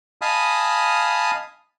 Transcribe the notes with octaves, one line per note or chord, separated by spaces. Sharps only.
D#5 F5 G#5 A5 B5 D#6